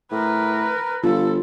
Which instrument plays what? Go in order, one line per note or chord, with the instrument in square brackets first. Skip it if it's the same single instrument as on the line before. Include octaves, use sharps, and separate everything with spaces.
[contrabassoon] A2 [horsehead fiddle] A#4 B4
[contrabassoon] G1 [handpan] F4 [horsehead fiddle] A4